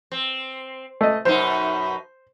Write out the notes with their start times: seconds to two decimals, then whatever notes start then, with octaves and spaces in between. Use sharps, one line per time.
0.12 C4
1.01 A3 D#5
1.25 F#2 B2 D#4 C5